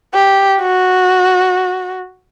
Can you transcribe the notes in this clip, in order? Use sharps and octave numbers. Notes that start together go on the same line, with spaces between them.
G4
F#4